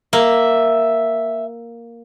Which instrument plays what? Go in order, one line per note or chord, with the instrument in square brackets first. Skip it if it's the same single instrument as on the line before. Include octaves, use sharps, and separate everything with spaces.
[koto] A#3 [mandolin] E5